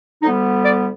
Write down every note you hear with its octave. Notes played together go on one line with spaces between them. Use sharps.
D2 D3 G3 B3 D#4
D5